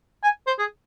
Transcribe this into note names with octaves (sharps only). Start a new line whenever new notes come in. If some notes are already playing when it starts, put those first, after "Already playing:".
G#5
C5
G#4